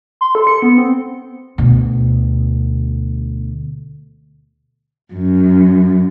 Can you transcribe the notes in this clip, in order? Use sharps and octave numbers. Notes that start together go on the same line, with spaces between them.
C6
A4
C#7
B3
C4
D2 B2
F#2